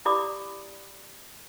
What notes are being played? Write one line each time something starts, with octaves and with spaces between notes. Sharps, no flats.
E4 G4 D5 B5 D6 D#6